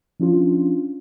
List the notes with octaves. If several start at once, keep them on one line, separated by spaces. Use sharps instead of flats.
F3 C#4 D4 F4